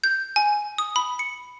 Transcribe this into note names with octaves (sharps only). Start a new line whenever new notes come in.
G6
G#5
D#6
B5
C#7